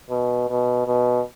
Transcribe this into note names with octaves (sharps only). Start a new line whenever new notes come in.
B2
B2
B2